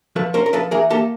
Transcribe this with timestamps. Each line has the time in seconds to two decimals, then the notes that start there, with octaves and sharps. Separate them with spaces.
0.16 F3 A4 B4
0.34 C#4 A#4 C5
0.46 A#4
0.53 F3 A4 B4
0.71 E3 G#4 A#4
0.90 A#3 G4 A4